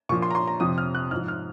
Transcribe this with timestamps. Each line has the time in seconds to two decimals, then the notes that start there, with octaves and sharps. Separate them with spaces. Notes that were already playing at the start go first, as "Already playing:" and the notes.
0.09 A#2 C#6
0.12 F3
0.22 C6
0.31 A#5
0.35 C6
0.47 A#5
0.60 F2 C3 F3 D#6
0.78 F6
0.95 F#6
1.11 G#2 F3 F6
1.28 F6